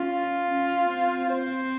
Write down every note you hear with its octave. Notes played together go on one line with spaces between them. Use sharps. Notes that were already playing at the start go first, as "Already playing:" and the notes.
Already playing: C#4 F4
C#4
C4
C5